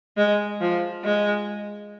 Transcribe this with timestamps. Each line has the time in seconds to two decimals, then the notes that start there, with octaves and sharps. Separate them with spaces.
0.17 G#3
0.61 F3
1.04 G#3